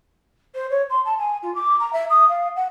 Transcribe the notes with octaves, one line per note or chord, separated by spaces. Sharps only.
C5
C#5
C6
A5
G#5
F4
D6
A#5
E5
D#6
F5
F#5